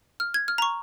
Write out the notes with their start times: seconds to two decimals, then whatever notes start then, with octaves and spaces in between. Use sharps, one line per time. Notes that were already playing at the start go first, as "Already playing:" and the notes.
0.20 F6
0.34 G#6
0.48 F6
0.58 A#5
0.62 C#6